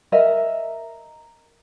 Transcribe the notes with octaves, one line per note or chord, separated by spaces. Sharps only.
A#4 D#5 E5